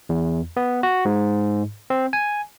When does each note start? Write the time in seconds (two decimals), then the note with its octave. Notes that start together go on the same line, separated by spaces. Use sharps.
0.09 E2
0.57 B3
0.83 F#4
1.05 G#2
1.90 C4
2.13 G#5